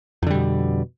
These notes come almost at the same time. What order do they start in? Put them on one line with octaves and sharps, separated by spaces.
F2 D3 G3 B2